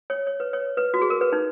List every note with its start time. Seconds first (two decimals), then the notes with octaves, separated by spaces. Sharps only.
0.10 C#5
0.27 C#5
0.40 B4
0.53 C#5
0.77 B4
0.94 F#4
1.02 G#4
1.10 A#4
1.21 B4
1.33 D#4